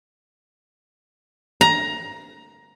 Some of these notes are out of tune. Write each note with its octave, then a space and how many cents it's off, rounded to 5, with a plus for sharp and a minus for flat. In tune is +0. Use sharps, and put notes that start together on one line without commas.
A#5 +15